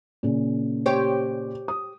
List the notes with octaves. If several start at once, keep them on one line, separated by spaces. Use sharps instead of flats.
A#2 C#3
G4 C5 C#5
D#6